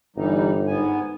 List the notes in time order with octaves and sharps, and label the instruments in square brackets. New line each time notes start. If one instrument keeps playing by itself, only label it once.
[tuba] G1 [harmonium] E3 G3 D#4
[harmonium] G#2 B3 G#5